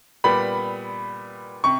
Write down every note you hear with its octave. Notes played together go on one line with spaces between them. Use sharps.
A#2 G3 B3 B5
C3 C#6